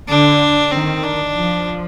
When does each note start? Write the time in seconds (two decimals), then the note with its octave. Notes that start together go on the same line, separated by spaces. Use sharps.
0.09 D3 D4
0.72 D#3 C4
1.03 D4
1.34 F3